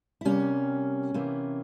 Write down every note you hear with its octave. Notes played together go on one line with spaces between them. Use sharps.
E4
C3 G3 A#3 C#4
C3 E3 A#3